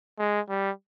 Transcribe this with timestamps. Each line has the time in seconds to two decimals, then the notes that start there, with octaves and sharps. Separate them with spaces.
0.19 G#3
0.49 G3